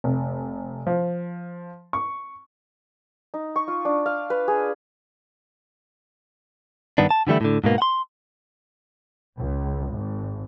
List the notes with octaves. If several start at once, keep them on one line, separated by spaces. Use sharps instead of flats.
F1
F3
C#6
D#4
C#6
F4
D4
F5
B4
G#4
G2 D#3 B3 D4
A5
D3 E3 G3 A3 E4
A2 D3
G#2 B2 A#3 B3
F#5 C6
C#2
G#1